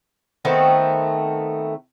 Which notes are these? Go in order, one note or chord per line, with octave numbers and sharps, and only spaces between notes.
D#3 A3 B3 C4